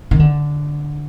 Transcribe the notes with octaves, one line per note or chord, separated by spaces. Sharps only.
D#3
D3